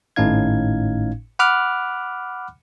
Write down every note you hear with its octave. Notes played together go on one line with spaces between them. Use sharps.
G#1 A2 C#4 D#4 F5 G#6
F#5 B5 D6 F6 F#6